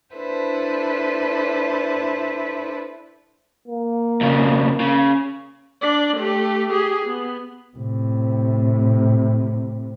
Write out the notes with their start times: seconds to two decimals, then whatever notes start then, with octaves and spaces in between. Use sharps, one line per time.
0.16 D4 E4 A4 B4 C5
3.68 A#3
4.21 F2 C#3
4.80 C#3
5.81 D4 D5
6.17 A3 G4
6.70 G4 G#4
7.06 B3
7.77 A2 C3